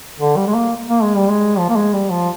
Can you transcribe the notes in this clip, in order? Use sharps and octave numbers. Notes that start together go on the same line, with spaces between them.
D3
G3
G#3
A#3
A#3
G#3
G3
G#3
F3
A#3
G#3
G3
F3